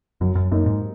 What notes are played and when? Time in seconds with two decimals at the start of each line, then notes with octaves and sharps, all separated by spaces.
0.21 F#2 F#3
0.35 F#2
0.51 F#2 A#3 D#4
0.66 G#2